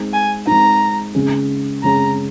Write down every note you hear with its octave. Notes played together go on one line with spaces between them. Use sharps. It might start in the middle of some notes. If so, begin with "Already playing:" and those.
Already playing: G#3 C4 D#4
G#5
G#3 C4 D#4 A#5
C#3 G#3 C#4 G#4
C#3 G#3 C#4 G#4 A#5